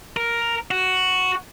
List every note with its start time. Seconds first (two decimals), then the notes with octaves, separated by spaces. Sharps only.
0.17 A#4
0.71 F#4